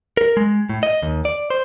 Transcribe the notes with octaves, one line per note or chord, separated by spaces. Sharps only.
A#4
G#3
A2
D#5
D#2
D5
C5